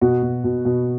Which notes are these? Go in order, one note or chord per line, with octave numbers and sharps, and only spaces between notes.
B2 F#4
B2
B2
B2